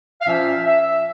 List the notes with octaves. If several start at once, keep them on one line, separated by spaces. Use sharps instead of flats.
F5
A#2 F3 C#4 E5
E5